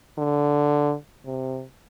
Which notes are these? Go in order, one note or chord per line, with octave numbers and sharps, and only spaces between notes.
D3
C3